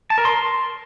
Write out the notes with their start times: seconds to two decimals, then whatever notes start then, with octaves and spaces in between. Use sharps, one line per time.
0.10 A5
0.18 A#4
0.25 C6